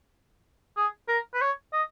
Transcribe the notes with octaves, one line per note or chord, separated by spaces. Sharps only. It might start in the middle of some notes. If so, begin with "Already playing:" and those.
G#4
A#4
B4
C#5
D#5